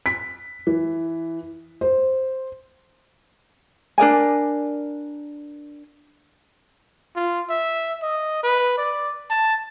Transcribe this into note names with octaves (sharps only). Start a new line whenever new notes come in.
B6
E3
C5
D4 A#4 D5 G#5
F4
E5
D#5
B4
D5
A5